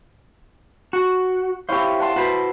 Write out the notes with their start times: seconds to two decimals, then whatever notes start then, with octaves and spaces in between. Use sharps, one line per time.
0.93 F#4
1.69 E4 G4 C5 C#5 F5
2.00 F#5 A5 C6
2.16 F#4 B4 C5